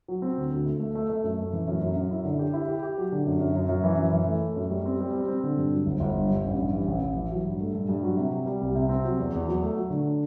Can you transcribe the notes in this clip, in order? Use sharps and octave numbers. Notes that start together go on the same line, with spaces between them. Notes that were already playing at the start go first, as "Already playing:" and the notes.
F#3
C4
D2
D2
A3
A3
A3
A3
F#2
A3
E3
F#2
F#2
F#2
E4
D3
G4
E4
G4
G4
F#3
D3
F#2
F#2
F#2
F#2
E3
F#2
E3
A3
A3
F#2
G3
C4
G3
C4
C4
D3
G2
F#3
G1
G1
G2
G2
A1
G2
E3
A1
A1
E3
F#3
G2
A3
G2
G2
F#3
C3
G3
G3
C2
C3
C4
F#3
E2
E2
F#3
A3
F#3
D3